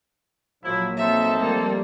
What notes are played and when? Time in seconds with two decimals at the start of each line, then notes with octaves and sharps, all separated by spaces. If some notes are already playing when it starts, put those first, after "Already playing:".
0.64 A#1 F3 F#3 A#3 E4
0.97 C4 D#4 A4 E5
1.39 F3 G3 A3 A#3